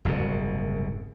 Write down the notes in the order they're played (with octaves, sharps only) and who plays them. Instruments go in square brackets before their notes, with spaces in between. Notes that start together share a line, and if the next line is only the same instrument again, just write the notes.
[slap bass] F#1 C2 G#2 B2